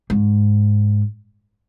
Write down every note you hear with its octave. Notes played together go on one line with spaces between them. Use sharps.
G#2